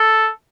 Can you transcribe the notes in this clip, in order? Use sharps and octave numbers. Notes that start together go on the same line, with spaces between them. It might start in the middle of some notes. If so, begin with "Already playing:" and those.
Already playing: A4